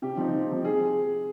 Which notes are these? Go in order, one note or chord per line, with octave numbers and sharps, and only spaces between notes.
C3 G4
F3 C4 D#4
C3
F3 C4 D#4
G#4